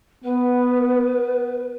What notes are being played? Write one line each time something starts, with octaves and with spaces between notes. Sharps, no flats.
B3 B4